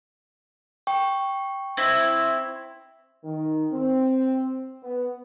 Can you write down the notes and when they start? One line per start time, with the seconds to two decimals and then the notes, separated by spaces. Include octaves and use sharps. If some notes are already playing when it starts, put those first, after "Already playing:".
0.87 G5 C#6
1.77 C4 E4
3.24 D#3
3.72 C4
4.83 B3